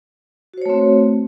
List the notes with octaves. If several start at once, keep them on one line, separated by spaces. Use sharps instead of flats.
A3 C4 F#4 C5 C#5